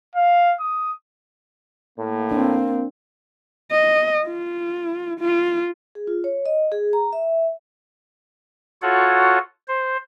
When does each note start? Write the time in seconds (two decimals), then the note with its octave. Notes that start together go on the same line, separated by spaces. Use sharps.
0.15 F5
0.60 D#6
1.98 A2 A#3
2.31 C4 D4
3.72 D#5
4.25 F4
5.20 F4
5.95 G#4
6.07 F4
6.24 C#5
6.46 D#5
6.72 G#4
6.93 A#5
7.13 E5
8.82 F4 F#4 A4 C#5 F#5
9.68 C5